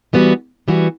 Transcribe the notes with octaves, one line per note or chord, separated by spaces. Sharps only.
E3 G3 B3 F#4
E3 G3 B3 F#4